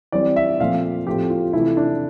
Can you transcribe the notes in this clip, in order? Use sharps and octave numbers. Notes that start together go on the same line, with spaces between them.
E3 G3 C4 D5
E5
A#2 F3 A3 C4 F5
A2 F3 A3 C4 G4
F4
C3 E3 A3 E4
D4